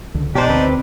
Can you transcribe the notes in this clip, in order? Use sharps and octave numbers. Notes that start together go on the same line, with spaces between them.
C#2 D3
B2 D4 D#4 G4 C5
D2 C4 B4